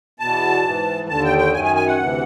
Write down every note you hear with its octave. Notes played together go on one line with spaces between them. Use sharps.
E2 B2 A5
G#2 E3
D#2 D3 A5
G5
G5
F#2 D#3 G#5
G#5
G#5
F#5
D2 C3 E3